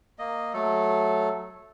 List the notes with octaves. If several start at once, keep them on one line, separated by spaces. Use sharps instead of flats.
A#3 D#5
F#3 A3 A4